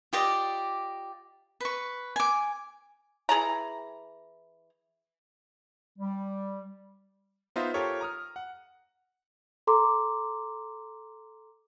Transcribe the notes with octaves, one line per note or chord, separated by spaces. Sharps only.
F4 G4 D5 D#5
B4 C#6
G#5 D6
E3 G#4 A5 A#5
G3
B3 D#4 F4 C5 D#5 E5
F4 G4 A4 A#4 C5 C#5
A#5 D#6 F6
F#5
A4 A#5 C6 D6